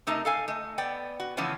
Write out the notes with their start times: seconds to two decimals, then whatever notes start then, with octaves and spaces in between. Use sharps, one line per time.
0.07 C3 A3 D#4 A#4 D#5
0.25 A4 F5 G#5
0.48 A3 D#5
0.78 B3 D5 G5
1.20 F#4
1.37 C#3 E3 F3 A3 B3 C#4